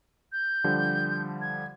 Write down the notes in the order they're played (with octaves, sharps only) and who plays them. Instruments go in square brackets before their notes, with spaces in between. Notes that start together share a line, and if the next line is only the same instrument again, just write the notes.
[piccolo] G6
[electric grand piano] D3 F3 G3
[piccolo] G#6